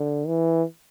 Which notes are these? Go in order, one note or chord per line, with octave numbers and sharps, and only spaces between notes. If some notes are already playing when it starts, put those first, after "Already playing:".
Already playing: D3
E3